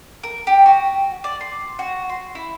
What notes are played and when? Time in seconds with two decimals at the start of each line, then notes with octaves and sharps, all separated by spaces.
0.23 A#4
0.47 G4
0.66 F#4
1.24 D5
1.41 C6
1.79 F#4
2.10 C6
2.35 E4